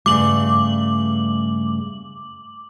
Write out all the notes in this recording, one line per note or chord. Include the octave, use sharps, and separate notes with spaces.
G2 C#3 A3 D6 F#7